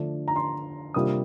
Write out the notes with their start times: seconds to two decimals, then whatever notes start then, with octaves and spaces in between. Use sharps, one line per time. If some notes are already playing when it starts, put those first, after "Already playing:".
Already playing: D3 F3 A3 D4
0.28 A#5
0.36 C6
0.94 C3 G3 A#3 D4 F4 D#6